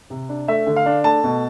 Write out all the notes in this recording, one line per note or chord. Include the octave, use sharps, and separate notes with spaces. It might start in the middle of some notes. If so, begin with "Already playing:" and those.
C3
D4
A3 E5
D3
F5
D4
A3 A5
B2